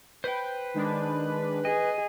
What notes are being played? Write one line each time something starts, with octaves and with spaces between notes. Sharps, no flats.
B4 C5 G5
D#3 G#3 D4
G#4 D#5